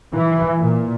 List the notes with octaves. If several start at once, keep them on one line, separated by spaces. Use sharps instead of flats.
E3
A#2